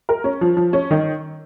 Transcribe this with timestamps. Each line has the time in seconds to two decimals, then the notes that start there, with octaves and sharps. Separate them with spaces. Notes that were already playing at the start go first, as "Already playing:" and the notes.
0.09 A#4
0.24 C#4
0.41 F3
0.57 F3
0.73 C#4
0.91 D#3